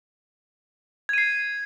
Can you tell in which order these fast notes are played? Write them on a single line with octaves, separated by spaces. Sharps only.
G#6 D#7 C7